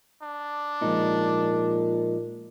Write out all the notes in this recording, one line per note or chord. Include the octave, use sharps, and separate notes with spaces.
D4
A#2 F3 G#3 D#4